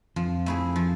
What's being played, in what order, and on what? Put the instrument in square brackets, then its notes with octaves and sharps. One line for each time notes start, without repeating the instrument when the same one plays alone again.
[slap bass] F2 [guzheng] F3
[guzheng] A3 E4 G#4
F3